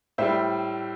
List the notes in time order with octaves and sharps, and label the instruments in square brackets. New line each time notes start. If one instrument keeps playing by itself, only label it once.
[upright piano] A2 G3 C5 E5